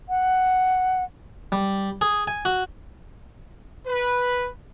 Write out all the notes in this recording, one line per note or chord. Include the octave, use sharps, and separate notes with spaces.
F#5
G3
G#4
G#5
F#4
B4